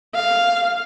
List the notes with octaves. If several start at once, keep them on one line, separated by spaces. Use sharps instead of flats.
F5